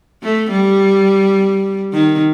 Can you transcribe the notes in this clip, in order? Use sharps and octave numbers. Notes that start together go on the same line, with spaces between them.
A3
G3
D#3